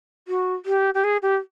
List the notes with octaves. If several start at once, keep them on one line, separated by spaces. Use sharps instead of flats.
F#4
G4
G4
G#4
G4